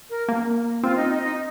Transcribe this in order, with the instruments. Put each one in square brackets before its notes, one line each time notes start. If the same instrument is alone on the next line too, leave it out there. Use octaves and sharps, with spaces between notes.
[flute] A#4
[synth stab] A#3
[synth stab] C4 [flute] F4
[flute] D#4
D#4
D#4